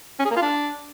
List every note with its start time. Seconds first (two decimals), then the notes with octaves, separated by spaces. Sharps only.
0.19 C#4
0.25 G#4
0.31 A#3
0.36 F4
0.42 D4